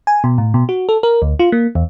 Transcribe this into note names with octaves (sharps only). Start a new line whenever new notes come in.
G#5
B2
A2
B2
F#4
A4
A#4
D2
F4
A#3
E2